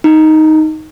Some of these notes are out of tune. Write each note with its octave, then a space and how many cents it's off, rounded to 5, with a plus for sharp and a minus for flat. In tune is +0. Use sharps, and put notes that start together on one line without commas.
D#4 +5